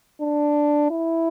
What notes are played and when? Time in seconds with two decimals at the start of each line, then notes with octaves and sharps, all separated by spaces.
0.21 D4
0.91 E4